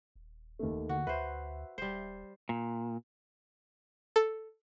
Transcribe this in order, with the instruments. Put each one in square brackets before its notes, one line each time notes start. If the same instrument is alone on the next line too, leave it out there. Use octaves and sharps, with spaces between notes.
[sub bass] D#1
[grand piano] D#2 A3
[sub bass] D3 [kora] F#4
[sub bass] D2 [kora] B4 C5 [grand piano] E5
[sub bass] D#1 [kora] G3 C5
[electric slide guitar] A#2
[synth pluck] A4